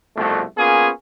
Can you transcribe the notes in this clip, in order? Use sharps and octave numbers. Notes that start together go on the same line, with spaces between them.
C2 F2 B2 A3
A#3 B3 C#4 F4 G#4